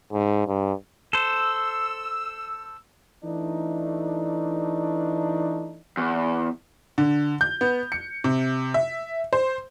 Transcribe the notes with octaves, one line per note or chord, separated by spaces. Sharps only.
G#2
G2
A4 C5 E6
E3 A3 D4 D#4
E2
D3
G6
B3
C#7
C3
E5
C5